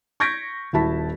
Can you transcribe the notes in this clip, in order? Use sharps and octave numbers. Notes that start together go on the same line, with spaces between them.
C#6 G6 G#6 A#6 B6 D7
D#1 E4 F#4 A5 B6